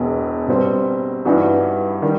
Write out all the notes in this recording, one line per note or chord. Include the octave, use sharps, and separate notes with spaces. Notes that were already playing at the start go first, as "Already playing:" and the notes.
Already playing: E1 E2 B2
B2 G3 C4
G2 E3 G3 D#4 F#4
D#3 G3